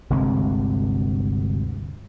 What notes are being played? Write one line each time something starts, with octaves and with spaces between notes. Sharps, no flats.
G1 D2 C3 G#3